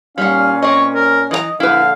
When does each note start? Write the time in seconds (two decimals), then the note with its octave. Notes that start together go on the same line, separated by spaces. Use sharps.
0.18 A#2 G3 C#4 D#4 F5 F#5
0.62 C4 C#5 D#5
0.95 A#4
1.31 E3 F#4 D#5 A#5
1.60 A#1 D3 E4 B4 F5